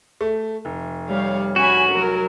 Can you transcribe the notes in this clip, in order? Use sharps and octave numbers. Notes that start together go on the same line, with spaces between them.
A3
F1
G3 C#5 F5
C#4 F#4 G#5 B5
F#3 A#4